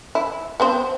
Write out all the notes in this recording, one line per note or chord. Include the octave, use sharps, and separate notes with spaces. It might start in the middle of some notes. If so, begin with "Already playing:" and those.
E4
B3 C4 C5